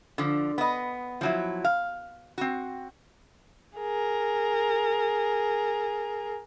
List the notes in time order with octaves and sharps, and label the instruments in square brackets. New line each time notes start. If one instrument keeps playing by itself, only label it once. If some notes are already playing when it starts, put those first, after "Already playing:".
[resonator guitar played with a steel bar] D3 F3
B3 D#5
F3 F#3 E4
F5
C4 F#4
[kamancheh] G#4 A#4